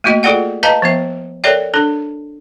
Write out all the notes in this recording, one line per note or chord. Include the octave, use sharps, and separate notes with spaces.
A3 A#3 F#4 D#5
F4 G#4 A4 D5 F#5 G5
B4 D#5 F5 A5 A#5
F3 B3 E5
A4 A#4 C#5 D5 E5 G5
D4 A4